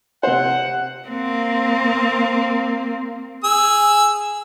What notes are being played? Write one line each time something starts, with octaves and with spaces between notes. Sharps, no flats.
C3 C5 F#5
A#3 C4
G#4 E6